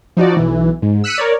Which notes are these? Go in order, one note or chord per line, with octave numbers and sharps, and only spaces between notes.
F3 D#4 F#4 D5
B1 E3
G#2
E6 F#6 B6 C#7 D#7
A#4 C#5 D5